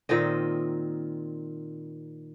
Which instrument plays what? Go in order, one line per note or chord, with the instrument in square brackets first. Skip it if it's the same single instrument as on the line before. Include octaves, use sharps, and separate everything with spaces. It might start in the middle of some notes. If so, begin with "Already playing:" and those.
[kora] A#2 D#3 C4 D#5